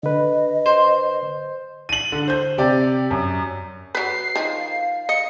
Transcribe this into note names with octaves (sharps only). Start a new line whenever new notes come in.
D3 B4 D#5
C5
D#7 F#7
D3
C5 G6
C3 G4 D5
F#2
F#3 B4 C7
D#3 F3
F5
D#5 C#7